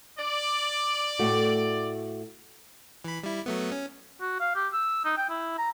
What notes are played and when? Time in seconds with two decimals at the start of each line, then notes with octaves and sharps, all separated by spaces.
0.19 D5
1.19 A2 A3 F#4
3.04 E3 B5
3.24 G3 E4
3.46 F#3 A3 B3
3.72 C#4
4.21 F#4
4.40 F5
4.55 G4
4.73 E6
5.05 D#4
5.17 G5
5.30 E4
5.58 A#5